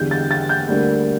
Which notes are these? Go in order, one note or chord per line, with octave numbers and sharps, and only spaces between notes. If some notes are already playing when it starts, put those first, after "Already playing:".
Already playing: E2 D3 G3 G6
A6
A6
G6
D2 D3 G3 A#3